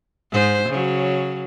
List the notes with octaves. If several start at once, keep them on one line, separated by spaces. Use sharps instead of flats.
G#2 C5
C#3 F#3